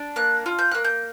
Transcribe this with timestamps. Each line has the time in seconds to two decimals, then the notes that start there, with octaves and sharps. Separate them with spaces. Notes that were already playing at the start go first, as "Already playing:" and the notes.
Already playing: D4
0.16 A#3 F#6
0.46 F4
0.59 G6
0.71 A#3 F#6
0.84 G6